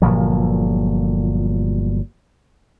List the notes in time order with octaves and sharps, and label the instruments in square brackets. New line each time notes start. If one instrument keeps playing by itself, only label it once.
[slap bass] G1 A#2 F3 F#3